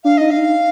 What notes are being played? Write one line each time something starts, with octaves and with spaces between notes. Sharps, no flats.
D4 F5
D#4 D#5
D4 F5
D#4